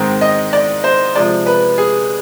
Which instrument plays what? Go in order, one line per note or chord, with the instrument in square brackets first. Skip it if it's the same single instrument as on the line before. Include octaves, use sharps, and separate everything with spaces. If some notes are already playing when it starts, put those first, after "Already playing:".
Already playing: [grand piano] G#2 D#3 G#3 C4
D#5
D5
C5
C3 F3 G#3 D5
B4
G#4